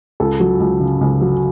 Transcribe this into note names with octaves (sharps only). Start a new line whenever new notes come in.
C#2 A4
F#3
C#2
C#3
C#2
F#3